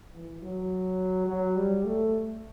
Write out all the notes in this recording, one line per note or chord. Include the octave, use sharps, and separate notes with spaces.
E3
F#3
F#3
G3
A3